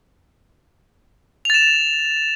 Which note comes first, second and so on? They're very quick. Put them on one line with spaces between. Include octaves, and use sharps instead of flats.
F7 A6 E7